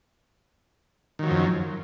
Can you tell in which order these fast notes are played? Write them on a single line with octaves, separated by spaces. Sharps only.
D#3 F#3 F3 F#2